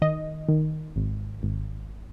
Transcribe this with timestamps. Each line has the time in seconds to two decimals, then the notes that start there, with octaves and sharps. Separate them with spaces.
0.02 D#3 D#5
0.49 D#3
0.96 G#1
1.43 G#1